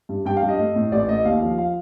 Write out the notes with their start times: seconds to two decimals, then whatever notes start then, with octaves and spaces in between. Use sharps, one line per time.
0.09 G2
0.25 G2 G5
0.37 F5
0.43 G2
0.49 D#5
0.59 A3
0.75 A2
0.92 A1 D5
1.08 A3 D#5
1.25 D#2 F5
1.42 F3
1.58 F5